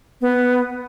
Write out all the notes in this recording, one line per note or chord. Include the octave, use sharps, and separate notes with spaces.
B3